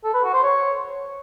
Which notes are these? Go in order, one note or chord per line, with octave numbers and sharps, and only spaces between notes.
A4
B4
F#4
C5
C#5